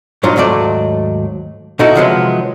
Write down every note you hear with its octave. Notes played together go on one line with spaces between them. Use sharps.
G2 A#2 F#3 D4 D#4 F4
D#2 G#2 F#3 A3 D5
B2 D#4 E4 F#4 A4
C3 D#3 F3 F#3 G#3 B3